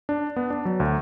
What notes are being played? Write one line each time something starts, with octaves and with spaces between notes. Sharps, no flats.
D4
B3
D4
F#3
D2